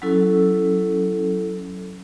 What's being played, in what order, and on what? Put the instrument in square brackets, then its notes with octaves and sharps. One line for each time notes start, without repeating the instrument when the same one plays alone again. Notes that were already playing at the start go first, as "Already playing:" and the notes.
[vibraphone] F#3 C#4 E4 A4